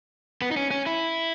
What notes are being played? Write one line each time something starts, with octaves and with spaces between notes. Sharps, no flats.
B3
D#4
C#4
C#4
E4